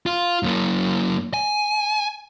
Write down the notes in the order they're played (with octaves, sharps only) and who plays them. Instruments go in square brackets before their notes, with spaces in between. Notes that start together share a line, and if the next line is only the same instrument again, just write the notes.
[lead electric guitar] F4
F#2 A#3
G#5